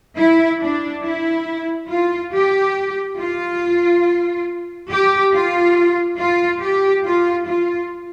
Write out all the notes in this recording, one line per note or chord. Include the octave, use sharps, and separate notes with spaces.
E4
D4
E4
F4
G4
F4
G4
F4
F4
G4
F4
F4